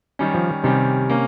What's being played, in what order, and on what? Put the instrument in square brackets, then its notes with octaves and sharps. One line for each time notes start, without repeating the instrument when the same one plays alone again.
[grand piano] D#3 G3 C#4
[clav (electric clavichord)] F3
[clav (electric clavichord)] C3 [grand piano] D#3 G3 C#4
[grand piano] A#3 C#4